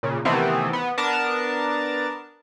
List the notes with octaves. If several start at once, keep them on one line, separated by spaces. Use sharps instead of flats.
A#2 C#3
C3 D#3 E3 A3 B3 C4
B3
B3 D4 A#4 A5